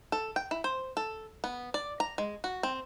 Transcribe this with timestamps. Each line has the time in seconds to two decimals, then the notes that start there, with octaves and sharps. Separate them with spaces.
0.12 A4
0.36 G5
0.51 E4
0.64 C5
0.97 A4
1.44 B3
1.74 D5
2.00 A#5
2.18 G#3
2.44 F#4
2.63 C4